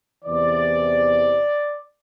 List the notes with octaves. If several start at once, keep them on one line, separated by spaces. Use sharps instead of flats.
E2 C3 E3 D5